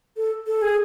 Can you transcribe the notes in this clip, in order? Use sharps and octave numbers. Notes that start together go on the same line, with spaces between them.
A4
A4
G#4